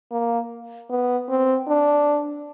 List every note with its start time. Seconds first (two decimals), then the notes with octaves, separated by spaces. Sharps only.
0.12 A#3
0.90 B3
1.29 C4
1.68 D4